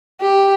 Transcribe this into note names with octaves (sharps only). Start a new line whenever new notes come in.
G4